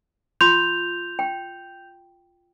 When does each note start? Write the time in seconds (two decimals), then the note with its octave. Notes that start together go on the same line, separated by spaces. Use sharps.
0.41 F4 C6 G6 F7
1.19 G5